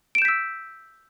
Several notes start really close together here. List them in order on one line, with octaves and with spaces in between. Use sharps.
D7 E7 G6 B6 E6